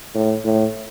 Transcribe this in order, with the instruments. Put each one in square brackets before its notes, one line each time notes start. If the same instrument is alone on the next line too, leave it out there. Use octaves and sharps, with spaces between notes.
[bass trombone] A2
A2